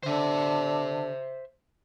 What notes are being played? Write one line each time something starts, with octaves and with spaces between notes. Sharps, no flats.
D3 C5 E5